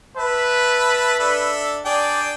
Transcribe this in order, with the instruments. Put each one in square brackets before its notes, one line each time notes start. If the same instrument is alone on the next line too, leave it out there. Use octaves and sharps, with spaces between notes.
[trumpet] B4 [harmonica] E5 A5
[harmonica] D4 A4 E5
[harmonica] D4 G#4 G5 [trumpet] D5